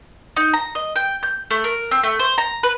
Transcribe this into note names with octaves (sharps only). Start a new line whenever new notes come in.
D#4
A#5
D#5
G5
G6
A3
A#4
C4
A3
C5
A#5
B4